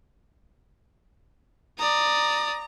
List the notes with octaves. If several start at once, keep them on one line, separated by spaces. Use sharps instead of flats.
D5 A#5 D#6